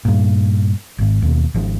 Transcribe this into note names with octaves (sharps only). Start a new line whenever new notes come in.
G2 A#2
G#1 G#2
D#2 B2
G#1 F3